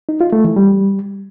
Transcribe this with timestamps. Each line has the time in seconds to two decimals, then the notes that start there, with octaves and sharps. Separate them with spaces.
0.09 D#4
0.21 F4
0.33 A3
0.44 E3
0.56 G3